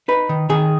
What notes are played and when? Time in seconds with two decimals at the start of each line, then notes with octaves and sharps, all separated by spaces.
0.08 D#4 B4
0.29 D#3
0.50 D#3 G#4